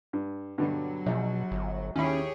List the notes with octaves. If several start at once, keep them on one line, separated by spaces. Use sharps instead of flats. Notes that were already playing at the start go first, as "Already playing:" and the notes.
G2
G2 B2 D3 F#3
A#1 B2
G1
D#2 C#4 E4 G4 G#4 C#5 B5